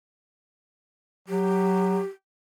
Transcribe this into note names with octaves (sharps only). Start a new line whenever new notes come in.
F#3 G4